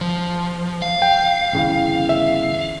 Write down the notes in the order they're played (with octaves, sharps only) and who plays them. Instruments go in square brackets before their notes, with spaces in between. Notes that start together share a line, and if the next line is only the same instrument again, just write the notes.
[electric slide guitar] F3
F5
[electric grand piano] G5
[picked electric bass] G1 C#3 E3
[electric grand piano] E5